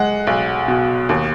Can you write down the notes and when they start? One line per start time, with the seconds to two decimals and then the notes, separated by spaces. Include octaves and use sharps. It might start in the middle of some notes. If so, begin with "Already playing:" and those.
Already playing: G#3 F#5
0.27 B1
0.68 B2
1.09 D#2